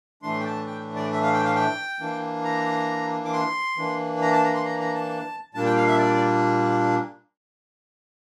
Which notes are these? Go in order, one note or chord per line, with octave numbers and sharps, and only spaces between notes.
A2 E3 A3 D4 C6
G5
A5
G5
D5
E5
F5
G5
F5
G5
E3 A#3 D4
A#5
D6
C6
E3 A#3 D4
A#5
A5
A#5
C6
A#5
A#5
A5
A#2 G3 A#3 D4 A5
G5
F5
E5
D5
D5